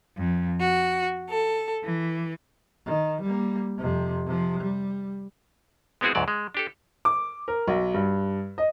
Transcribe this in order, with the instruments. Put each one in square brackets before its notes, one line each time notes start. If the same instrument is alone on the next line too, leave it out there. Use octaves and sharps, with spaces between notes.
[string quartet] F2
F#4
A4
E3
[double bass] D#3
G3 A#3
F2 C3
C3 F3
G3
[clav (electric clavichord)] G#3 B3 C4 E4 F#4 G#4
D2 G#2 F#3 D5
G#3
D4 G4 A4
[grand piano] D6
A#4
B1
G2
D#5